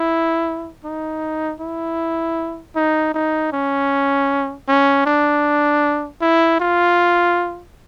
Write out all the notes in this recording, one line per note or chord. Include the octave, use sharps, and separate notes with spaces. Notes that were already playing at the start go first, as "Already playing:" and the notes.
Already playing: E4
D#4
E4
D#4
D#4
C#4
C#4
D4
E4
F4